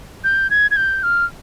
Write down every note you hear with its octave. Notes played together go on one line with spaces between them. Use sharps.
G6
G#6
G#6
G6
F6